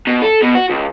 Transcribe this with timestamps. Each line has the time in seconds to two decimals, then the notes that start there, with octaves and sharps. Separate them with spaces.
0.07 B2
0.22 A4
0.43 B2
0.55 F#4
0.70 C#2